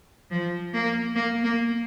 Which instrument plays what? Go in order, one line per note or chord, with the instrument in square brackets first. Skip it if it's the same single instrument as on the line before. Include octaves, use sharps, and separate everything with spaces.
[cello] F3
A#3
A#3
A#3